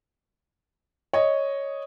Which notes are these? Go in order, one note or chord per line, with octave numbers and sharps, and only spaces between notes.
C#5 D#5